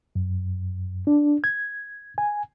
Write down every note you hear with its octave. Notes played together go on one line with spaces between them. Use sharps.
F#2
D4
G#6
G#5